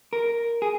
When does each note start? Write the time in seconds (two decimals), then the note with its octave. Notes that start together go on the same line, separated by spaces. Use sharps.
0.13 A#4
0.62 G#4